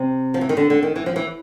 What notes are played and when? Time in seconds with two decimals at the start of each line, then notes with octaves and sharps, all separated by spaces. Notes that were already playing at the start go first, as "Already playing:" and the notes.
Already playing: C3
0.34 F3
0.41 E3
0.49 D#3
0.57 D3
0.70 D3
0.83 D#3
0.96 E3
1.06 F3
1.16 E3